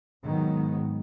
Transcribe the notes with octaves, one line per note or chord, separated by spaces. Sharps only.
G#2 D#3 F#3 B3